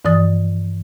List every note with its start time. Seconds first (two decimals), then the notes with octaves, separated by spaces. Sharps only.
0.05 G2 E3 F3 D5 D#6 A6